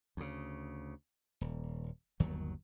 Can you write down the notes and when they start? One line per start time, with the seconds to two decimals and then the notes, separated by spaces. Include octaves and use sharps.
0.17 D2 C#3
1.41 D#1
2.20 G1 D#2 D#3 F#3